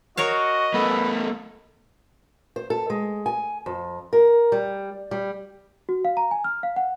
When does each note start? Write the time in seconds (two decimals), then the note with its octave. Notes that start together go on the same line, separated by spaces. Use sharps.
0.17 F#4 A#4 C#5 D#5 F5
0.74 A3 B3 B4
2.56 C5
2.70 A4
2.90 G#3
3.26 G#5
3.66 F2
4.13 A#4
4.52 G3
5.11 G3
5.89 F#4
6.05 F5
6.17 A#5
6.31 G#5
6.44 F6
6.63 F5
6.76 F#5